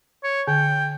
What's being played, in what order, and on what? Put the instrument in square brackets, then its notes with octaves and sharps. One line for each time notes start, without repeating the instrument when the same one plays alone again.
[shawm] C#5
[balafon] D3 [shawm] G5